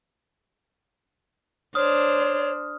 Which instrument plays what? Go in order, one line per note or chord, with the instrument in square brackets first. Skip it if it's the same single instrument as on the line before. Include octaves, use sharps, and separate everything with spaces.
[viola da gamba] D4 C5 [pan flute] C#5 [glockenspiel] D#6 F6